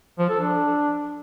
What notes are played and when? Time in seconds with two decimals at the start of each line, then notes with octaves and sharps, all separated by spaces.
0.19 F3
0.30 A4
0.41 D4